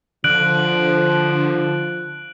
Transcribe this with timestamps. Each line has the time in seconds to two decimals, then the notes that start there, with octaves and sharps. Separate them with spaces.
0.24 D3 F3 F#6 D7 F#7